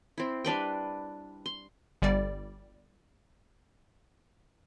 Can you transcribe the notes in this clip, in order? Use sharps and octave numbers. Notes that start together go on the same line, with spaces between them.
C4 E4
G3 D4 B4 G5
C6
G1 G3 D5